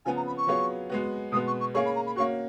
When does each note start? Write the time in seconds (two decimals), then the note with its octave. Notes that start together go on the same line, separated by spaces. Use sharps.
0.05 C#3 F3 B3 G#5
0.16 A#5
0.26 B5
0.37 C#6
0.47 F#3 B3 F4 G#4 C#5
0.89 G#3 B3 F#4
1.32 B2 G#3 B3 D#6
1.47 C#6
1.60 C#6
1.74 A#3 C#4 G#4 C#5 C#6
1.85 B5
1.95 A#5
2.06 B5
2.16 A#3 C#4 F#4 C#6